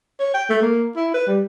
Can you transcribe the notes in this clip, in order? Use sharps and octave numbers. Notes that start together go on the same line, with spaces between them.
C#5
G5
A3
A#3
E4
B4
G3